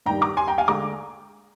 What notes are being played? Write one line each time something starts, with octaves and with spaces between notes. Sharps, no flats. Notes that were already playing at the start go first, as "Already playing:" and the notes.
G2 D#3 G3 G5 A#5
A#5 D6
G#5 C6
G5 A#5
F5 G#5
D3 G#3 A#5 D6